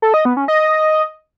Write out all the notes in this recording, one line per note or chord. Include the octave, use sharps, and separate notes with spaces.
A4
D#5
B3
C#4
D#5